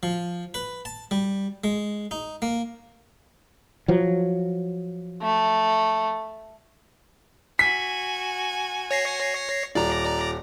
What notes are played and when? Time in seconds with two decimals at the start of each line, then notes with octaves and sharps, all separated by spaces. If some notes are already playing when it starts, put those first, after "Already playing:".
0.03 F3
0.54 B4
0.85 A5
1.11 G3
1.64 G#3
2.11 D#4
2.42 A#3
3.88 F3 F#3
5.22 A3
7.59 F#4 G#5 B6
8.91 C#5 A#6 C7
9.75 D#1 D5 A#5